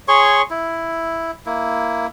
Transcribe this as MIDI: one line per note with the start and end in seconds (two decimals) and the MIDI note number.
0.08 0.42 68
0.08 0.42 73
0.08 0.42 84
0.08 0.42 85
0.50 1.31 64
1.46 2.07 58
1.46 2.07 64